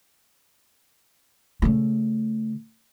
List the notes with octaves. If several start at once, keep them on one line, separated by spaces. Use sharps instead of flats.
C#3 A3